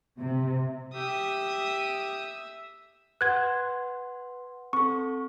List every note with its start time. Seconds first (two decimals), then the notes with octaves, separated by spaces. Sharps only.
0.19 C3
0.95 G4 E5 D#6
3.21 B4 F#5 C6 F#6 G#6
4.73 C4 A4 C#6